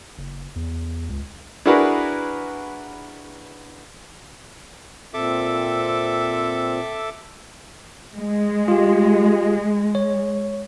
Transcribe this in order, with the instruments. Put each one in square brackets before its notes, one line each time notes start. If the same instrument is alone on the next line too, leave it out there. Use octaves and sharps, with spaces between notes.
[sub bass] F#1
E2
C#2
[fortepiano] D4 E4 F#4 G#4 A#4 B4
[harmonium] A#2 C4 [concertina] A4 E5 D6
[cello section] G#3
[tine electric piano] F4 G4
C#5